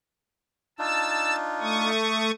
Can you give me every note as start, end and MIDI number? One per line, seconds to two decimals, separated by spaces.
0.79 1.91 62
0.79 1.91 63
0.79 1.91 65
0.79 1.36 81
0.79 1.36 88
1.61 2.31 57
1.61 2.31 85
1.61 2.31 87